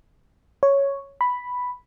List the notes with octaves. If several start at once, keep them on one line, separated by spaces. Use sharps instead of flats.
C#5
B5